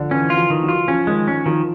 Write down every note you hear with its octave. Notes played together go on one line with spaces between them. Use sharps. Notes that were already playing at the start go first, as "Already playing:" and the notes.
Already playing: D3 F3
E3 C#4
F4
F3
D#3
F#3
F4
F3 C#4
D#3 G#3
C#4
D#3 F3